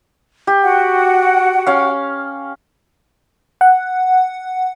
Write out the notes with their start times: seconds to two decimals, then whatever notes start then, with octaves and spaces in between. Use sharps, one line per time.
0.47 G4
0.64 F#4 F#5 G5
1.67 C#4 F5
3.61 F#5